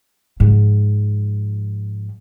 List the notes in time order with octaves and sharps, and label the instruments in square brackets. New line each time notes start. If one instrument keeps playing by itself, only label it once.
[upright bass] G#2 F3